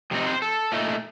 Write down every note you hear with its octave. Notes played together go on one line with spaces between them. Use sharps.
F2 C3 C4 D#4
C5
A4
A#2 A3 D#4